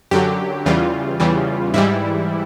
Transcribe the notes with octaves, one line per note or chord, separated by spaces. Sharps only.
F#2 D3 F#3 G4
E2 C#3 E3 G3 F4
E2 C#3 E3 G3
G#2 E3 G3 E4